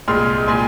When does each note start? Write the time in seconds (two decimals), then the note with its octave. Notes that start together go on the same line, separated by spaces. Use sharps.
0.08 C2 A#2 G#3 C6 F6
0.48 A#2 G#3 G#5 C6